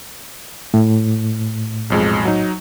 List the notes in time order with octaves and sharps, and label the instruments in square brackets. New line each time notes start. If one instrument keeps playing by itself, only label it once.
[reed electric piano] A2
[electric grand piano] B1 F2 G#3
F#3 D#4